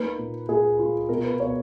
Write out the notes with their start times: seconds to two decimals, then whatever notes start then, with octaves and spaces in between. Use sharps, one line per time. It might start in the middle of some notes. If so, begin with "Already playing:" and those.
Already playing: A#3 D#4 B4
0.18 A#2
0.49 A#2 G#4
0.79 F4
1.09 B2 A#4
1.24 B4
1.39 B2 C#5